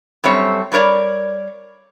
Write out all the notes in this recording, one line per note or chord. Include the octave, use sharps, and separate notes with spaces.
F#2 G3 A3 C4 C#5
F#3 G3 A#4 C#5 D5